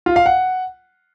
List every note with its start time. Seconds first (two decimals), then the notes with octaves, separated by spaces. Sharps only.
0.06 F4
0.16 F5
0.26 F#5